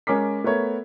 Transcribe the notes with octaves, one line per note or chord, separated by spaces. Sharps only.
G#3 C#4 A#4 D6 B6
A3 B3 A#4 C#5